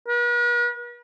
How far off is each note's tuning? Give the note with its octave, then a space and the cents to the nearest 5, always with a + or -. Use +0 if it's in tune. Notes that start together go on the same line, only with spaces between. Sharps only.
B4 -45